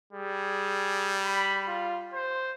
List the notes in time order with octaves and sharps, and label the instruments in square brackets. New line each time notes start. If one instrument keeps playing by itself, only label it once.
[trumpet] G3 [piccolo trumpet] G#4
[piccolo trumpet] B5
F4
C5